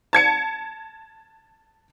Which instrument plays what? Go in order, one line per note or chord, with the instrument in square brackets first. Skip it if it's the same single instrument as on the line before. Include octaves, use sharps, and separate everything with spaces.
[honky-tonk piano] A5 G#6 C#7